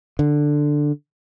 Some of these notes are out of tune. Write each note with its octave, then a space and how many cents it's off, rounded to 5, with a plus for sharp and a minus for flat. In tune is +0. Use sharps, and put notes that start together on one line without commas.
D3 +5